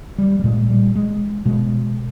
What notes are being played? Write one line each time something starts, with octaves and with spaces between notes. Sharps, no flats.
G3
G3
A#2 G#3
G3
G#3
B2 G#3